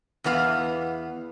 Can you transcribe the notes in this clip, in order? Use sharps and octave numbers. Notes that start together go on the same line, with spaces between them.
E2 E3 B3 D#4 F5